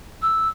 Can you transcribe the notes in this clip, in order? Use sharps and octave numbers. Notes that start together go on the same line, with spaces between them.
E6